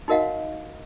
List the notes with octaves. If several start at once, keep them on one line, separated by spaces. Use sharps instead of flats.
D#4 F#4 A#4 D#5 F5 F#5